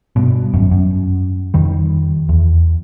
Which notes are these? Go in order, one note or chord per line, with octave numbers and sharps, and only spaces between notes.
G2 B2
G#1 F#2
F#2
F2 D#3 G3
E2